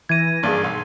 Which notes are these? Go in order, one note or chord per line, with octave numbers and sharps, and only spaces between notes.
E3 G#6 A#6 D#7
G#1 G2 A#3 G#4 D5
B1 C6